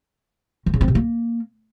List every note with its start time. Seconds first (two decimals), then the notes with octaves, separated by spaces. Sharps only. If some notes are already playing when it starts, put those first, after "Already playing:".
0.66 D#3
0.74 C#3
0.81 C4
0.88 C3
0.95 A#3